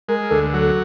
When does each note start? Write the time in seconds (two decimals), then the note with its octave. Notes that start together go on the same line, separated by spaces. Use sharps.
0.08 G#3 A#4
0.31 D2 A4
0.53 F#3